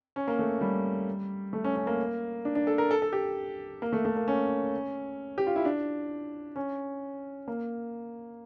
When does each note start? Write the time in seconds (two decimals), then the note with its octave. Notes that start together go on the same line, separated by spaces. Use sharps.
0.16 C#4
0.28 A#3
0.39 A3
0.61 G3
1.53 A3
1.64 C#4
1.76 C#4
1.87 A#3
2.45 D4
2.55 D4
2.67 A4
2.78 A#4
2.91 A4
3.02 A4
3.13 G4
3.82 A#3
3.93 A3
4.05 A3
4.17 A#3
4.28 C#4
5.38 G4
5.47 F4
5.56 E4
5.65 D4
6.56 C#4
7.48 A#3